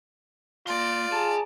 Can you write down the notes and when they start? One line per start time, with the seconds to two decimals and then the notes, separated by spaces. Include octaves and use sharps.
0.67 A#3 F4 D5 C6
1.12 G#4 A5 A#5